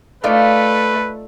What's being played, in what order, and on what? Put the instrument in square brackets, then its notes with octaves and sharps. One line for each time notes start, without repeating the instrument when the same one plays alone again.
[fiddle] A3 [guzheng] D#4 F4 D5 [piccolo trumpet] B4